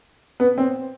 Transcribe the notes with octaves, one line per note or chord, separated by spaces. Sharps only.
B3
C4